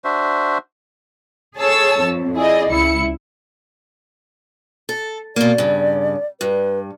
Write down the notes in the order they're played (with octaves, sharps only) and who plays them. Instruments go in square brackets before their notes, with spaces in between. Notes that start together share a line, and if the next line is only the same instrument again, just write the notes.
[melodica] D4 F#4 C5 E5
[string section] G#4 A4 C#5 A5 E6
F2
E4 G#4 D5 D#5
C#2 E4 C#7
[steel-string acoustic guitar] A4
[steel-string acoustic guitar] B2 A#3 [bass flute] D5
[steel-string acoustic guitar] G2 C#3
[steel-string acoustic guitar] G2 [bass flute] B4